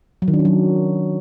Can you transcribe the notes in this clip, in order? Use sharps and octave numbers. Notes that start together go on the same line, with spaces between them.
F#3
D#3
D4
C#4
F#3